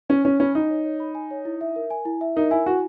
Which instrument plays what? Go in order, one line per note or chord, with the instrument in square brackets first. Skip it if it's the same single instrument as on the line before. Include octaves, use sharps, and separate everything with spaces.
[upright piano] C#4 [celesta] C#5
[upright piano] C#4 [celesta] C#5
[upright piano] C#4 [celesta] B5
[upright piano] D#4 [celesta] G#5
[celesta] C#5
C#5
B5
G#5
C#5
E4
E5
A#4
G#5
E4
E5
[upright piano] D#4 [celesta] A#4
[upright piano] E4 [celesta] G#5
[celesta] E4 [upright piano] F#4